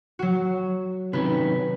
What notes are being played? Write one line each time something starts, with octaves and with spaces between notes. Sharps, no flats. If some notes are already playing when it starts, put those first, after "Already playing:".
F#3 F#4
C3 D#3 C#4 B4